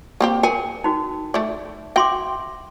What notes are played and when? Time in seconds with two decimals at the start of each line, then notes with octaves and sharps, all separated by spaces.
0.21 A#3 C4 G4
0.43 G#4 A#4 G5
0.84 D#4 F#4
1.34 A3 D5
1.96 F#4 E5 G5 C6 D6